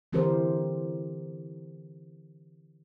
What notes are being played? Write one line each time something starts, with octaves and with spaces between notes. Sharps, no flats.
D3 E3 C4 G4 A#4 C5